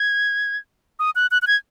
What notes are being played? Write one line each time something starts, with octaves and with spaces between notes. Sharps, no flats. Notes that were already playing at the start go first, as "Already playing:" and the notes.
Already playing: G#6
D#6
F#6
F#6
F#6
G#6